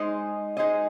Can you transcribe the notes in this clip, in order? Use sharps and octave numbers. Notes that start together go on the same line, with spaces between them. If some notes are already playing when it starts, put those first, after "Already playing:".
Already playing: G#3 D#4 G#4 C5 D#5
G#3 D#4 G#4 C5 D#5